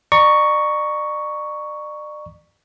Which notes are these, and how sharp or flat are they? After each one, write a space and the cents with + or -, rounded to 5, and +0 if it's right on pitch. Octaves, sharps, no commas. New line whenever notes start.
D5 +40 A#5 +10 C#6 +5